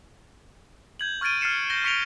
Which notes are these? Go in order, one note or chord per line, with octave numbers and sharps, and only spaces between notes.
G6 G#6 F#7
C#6 F6 G#6 A6 D7 D#7
F6 A6 C7 C#7 E7
G6 A#6 G7
C#6 B6 C#7 D7 F7 G7